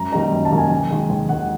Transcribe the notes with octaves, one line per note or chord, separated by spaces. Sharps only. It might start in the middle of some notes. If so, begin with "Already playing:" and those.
Already playing: F#2 A#5
D#3 G3 A#3 D#4 A#5
F#2
A5
D#3 G3 A#3 D#4
G#5
D#2
D#3 G#3
D#2
D#3 G#3 F#5